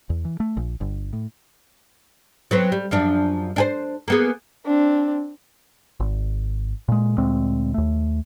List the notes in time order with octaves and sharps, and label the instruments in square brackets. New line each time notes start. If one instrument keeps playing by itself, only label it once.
[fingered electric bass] E2
E3
A3
A#1
G1
A2
[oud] F#3 B3 C4
G3
F#2 F3 D4
D4 G#4 C5
A#3 B3 G#4
[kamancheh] C4 D4
[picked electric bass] G#1
A#2 G#3
D2 A#2 G#3 C4
D#2 A3